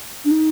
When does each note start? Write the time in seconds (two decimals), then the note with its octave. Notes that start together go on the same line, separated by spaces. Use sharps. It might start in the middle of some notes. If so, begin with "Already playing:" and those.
0.25 D4
0.31 D#4